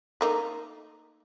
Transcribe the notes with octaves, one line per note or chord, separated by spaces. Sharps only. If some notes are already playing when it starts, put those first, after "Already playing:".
A3 A#3 D#4